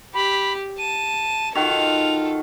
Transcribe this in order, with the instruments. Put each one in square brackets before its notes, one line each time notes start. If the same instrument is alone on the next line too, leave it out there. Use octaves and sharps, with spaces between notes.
[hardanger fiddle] G4 [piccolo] B5
[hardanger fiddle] A5 [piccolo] D#7
[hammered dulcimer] D#3 F#4 [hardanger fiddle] F4 A4 [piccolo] F7